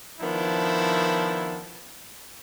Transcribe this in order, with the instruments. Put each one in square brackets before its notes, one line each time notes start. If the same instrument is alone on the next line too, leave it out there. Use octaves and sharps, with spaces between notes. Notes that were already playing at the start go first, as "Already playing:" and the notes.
[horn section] D#3 F3 B3 D4 E4